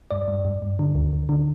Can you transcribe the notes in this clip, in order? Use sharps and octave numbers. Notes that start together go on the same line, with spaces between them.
G2 D5
G2
G2
G2
D3
D2
D2
D3